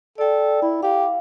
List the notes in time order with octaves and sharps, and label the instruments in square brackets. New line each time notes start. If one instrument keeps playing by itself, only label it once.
[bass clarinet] A4 [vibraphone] D5 G5
[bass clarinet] E4
[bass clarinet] G4 [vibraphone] F5